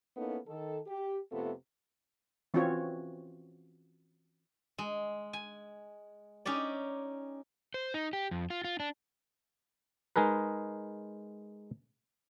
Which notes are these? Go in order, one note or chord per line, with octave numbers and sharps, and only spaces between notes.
A#3 B3 C#4 D#4 E4 A4
D#3 A4
G4
F2 C3 A3 B3 F4 A4
E3 C4 C#4 F4 F#4 C#5
G#3
G#5
C#4 D#4 G4 D5
C5
D#4
G4
F2
F4
F4
D4
G#3 D#4 G#4 A#4 B4